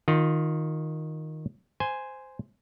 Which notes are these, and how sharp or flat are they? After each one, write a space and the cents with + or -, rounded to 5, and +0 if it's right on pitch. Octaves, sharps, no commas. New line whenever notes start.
D#3 +0 F4 +20
C5 -10 G#5 +0